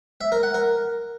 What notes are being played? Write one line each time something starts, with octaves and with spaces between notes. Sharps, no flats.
E5
A#4
F#5
A#4